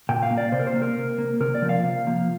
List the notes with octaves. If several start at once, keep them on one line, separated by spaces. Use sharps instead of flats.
A#2 G5
F5
A#3
D5
C3 C5
A#4
C5
A#3
A#4
C3
A#3
C3 A#4
D5
F3 A#3
F5
C3
F3 A#3